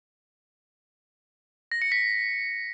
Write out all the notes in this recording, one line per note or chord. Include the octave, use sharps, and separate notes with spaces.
A#6
C#7
B6